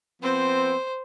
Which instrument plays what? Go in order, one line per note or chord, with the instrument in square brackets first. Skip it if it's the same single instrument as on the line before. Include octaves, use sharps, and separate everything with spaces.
[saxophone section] F3 B3 C4 [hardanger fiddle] C5